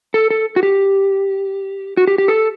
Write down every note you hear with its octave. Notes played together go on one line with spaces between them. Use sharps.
A4
A4
F#4
G4
F#4
G4
G4
A4